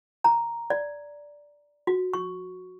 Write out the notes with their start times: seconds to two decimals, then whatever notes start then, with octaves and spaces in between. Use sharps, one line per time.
0.24 A#5
0.70 D5
1.87 F#4
2.14 C#6